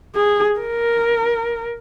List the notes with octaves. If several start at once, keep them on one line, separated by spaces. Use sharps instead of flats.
G#4
A#4